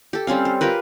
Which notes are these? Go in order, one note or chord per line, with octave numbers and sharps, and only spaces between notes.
G4 A4
G3 C4 C#4 F5
C5
F4 G4 A#4 B4